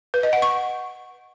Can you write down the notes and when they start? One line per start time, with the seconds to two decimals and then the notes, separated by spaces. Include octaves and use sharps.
0.14 B4
0.23 D#5
0.33 F#5
0.42 C#6